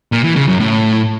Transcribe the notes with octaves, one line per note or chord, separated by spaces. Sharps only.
A#2
E3
C#3
F#2
A2